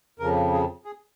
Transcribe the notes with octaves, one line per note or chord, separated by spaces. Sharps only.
F2 C#3 F3 A#4
G#4
G#4